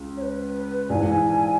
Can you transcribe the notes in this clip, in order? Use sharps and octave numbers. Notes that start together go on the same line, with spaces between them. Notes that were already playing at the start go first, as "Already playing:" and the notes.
Already playing: C#2 C#4
C#5
B4
A#1 G#2 E3 G#5